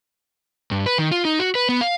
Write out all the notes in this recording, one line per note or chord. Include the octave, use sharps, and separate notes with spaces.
G2
B4
D#3
F4
D#4
F#4
B4
B3
F5